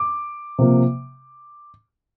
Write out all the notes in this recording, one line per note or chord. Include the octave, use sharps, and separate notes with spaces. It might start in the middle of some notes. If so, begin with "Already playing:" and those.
Already playing: D6
C3 F3 A#3